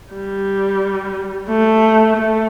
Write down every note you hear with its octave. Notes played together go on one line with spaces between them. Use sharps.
G3
A3
A3